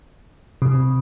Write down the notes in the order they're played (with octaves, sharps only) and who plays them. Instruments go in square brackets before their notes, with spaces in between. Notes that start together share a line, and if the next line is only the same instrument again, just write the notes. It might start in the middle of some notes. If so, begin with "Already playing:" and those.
[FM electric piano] C3